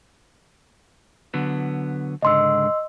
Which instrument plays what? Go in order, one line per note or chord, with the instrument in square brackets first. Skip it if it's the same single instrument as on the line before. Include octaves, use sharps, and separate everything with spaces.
[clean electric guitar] D3 F#3 B3
[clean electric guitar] C#2 G#2 D3 [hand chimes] D#5 C6 E6